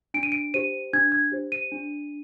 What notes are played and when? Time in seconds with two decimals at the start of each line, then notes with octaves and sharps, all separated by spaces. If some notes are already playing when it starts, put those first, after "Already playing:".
0.14 D4 D7
0.23 D#7
0.32 D7
0.54 G4 C5 D#7
0.93 D4 G#6
1.12 G#6
1.32 G4 C5
1.52 D#7
1.72 D4